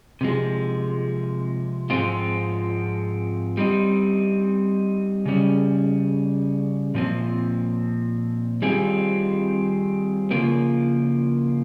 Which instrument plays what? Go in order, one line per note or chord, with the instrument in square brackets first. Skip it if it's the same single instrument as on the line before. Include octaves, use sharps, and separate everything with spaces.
[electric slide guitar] C3 F3 G#3
G#2 F3 G#3 C4 F4
G3 C4 D#4
C#3 G3 C#4 G#4
A#2 F3 C4
D#3 G3 C4 F4 G#4
C#3 F3 A#3 F4 A#4